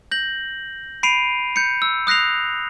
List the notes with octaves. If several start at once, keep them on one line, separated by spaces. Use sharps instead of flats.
G6 A#6 F#7
B5 C7 D7 D#7 F7
G6 C#7
E6
D#6 F#6 A#6 C7 F7